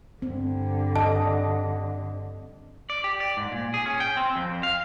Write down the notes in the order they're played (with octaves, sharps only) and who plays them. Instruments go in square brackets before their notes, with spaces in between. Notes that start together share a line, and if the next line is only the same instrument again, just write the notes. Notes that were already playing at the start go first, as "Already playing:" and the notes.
[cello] G2 D3 [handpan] C4
[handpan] A4 D5 D#5 [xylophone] A5
[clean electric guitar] D5
G4
D5
G#2
A#2
G#4
C#4
G5
C4
F2
F5